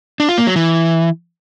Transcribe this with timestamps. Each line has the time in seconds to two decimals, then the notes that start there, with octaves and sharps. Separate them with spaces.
0.20 D4
0.29 F4
0.38 A#3
0.47 F#3
0.56 E3